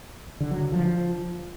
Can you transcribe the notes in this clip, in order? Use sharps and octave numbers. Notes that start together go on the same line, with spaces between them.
D3
F#3
D3
F3